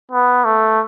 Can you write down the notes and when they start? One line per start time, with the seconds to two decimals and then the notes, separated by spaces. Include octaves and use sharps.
0.11 B3
0.45 A3